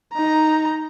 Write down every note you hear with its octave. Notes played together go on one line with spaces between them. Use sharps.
D#4 A#5